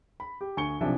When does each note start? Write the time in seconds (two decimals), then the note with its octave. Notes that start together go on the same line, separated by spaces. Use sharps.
0.20 B5
0.41 G4
0.57 D2 G#5 C#6 C#7 G7
0.80 B1 C3 F3 D4 E5 G#5